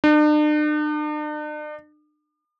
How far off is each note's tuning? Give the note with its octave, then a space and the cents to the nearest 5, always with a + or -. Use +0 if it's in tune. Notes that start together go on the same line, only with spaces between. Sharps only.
D4 +45